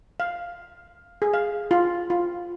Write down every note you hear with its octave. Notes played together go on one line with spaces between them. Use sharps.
F5
G#4
F5
F4
F4